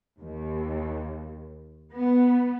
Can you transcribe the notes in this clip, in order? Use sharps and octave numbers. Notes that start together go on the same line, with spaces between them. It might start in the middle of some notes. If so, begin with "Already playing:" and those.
D#2
B3